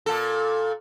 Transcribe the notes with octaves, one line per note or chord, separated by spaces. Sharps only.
A#2 A4